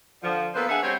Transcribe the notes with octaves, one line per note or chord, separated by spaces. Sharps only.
D3 F3
A#3 B3 F4 A4 B4 C5
D4 G#4 E5 F#5
G3 C4 F#4 C5 C#5